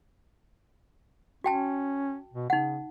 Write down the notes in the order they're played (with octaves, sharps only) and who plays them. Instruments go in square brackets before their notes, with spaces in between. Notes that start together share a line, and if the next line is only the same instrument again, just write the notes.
[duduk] C#4 [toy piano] F#4 G5 A5
[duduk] B2
[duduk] C#3 [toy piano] D#4 F#5